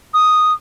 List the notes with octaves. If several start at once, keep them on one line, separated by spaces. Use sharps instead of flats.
D#6